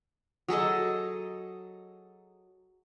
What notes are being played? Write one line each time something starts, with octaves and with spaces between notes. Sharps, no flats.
F#3 G#4 A4 D#5